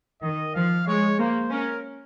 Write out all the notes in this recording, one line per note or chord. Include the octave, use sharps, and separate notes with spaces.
D#3 D#5
F3 F5
G#3 C#5
A#3 C5
C#4 A#4